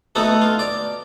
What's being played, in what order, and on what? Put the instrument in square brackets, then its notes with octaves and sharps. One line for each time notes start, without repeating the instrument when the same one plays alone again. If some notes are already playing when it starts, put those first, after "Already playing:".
[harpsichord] A3 B3 D#4 E4 F#4 A4
F4
D5